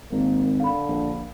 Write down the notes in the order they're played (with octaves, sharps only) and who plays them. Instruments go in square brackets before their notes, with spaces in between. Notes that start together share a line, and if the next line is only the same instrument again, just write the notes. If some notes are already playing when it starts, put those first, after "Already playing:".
[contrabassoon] G#1 [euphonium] A#3
[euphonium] D3 [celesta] F5 B5
[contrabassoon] A#1